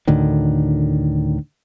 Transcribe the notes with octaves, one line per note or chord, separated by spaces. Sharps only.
D2 A2 D3 D#3